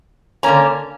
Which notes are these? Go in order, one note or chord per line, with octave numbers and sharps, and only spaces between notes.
D3 A#3 C#4 A#5